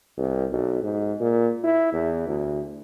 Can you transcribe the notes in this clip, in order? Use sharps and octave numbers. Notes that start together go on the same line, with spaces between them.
C2
B1
G#2
A#2
E4
E2
D2